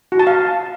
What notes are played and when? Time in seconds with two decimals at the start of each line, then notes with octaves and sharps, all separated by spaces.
0.12 F#4
0.19 A5
0.27 F5